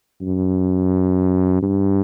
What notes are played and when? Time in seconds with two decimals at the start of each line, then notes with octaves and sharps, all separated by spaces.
0.21 F#2
1.62 G2